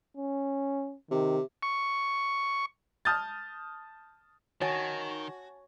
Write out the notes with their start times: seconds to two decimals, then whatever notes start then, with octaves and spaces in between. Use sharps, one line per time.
0.17 C#4
1.11 C3 D#3
1.63 C#6
3.05 A5 D#6 F6 G6 A6
4.62 D#3 F#4 C#5 G#5 A5 A6